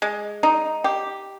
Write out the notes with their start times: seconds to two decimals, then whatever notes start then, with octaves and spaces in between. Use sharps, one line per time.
0.02 G#3
0.43 D#4
0.84 G4